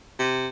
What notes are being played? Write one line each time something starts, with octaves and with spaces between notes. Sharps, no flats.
C3